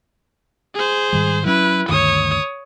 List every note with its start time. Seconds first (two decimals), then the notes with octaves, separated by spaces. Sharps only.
0.75 G#4 C5
1.12 G#2 D#3 G3
1.46 F#3 C#4 E4 B4
1.89 D2 G2 D#3 C#5 D#6